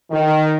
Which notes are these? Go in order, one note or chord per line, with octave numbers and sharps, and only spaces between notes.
D#3